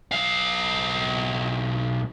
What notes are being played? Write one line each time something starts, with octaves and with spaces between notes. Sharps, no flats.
B1 F5